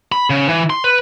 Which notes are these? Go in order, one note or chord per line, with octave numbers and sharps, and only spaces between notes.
B5
C#3
E3
C6
B4